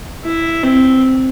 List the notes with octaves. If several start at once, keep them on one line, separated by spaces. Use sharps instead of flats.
E4
C4